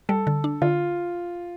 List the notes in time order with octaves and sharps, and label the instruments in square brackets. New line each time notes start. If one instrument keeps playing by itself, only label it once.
[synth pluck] G3 [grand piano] A4
[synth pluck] D3
D4
[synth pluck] D3 [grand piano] F4